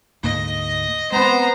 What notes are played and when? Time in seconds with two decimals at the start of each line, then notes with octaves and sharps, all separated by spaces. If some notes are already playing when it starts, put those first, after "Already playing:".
0.23 D2 G#2 A#3 D#5
1.12 G#3 B3 C4 C5 A#5